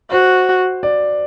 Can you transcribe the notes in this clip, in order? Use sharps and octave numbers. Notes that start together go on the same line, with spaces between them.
F#4 C5
D5